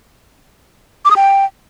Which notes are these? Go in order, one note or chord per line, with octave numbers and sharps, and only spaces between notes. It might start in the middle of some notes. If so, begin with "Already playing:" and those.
D6
D#6
G5